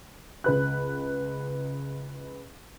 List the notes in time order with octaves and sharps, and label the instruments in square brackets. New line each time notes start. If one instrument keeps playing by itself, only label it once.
[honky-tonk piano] C#2 B4 F#6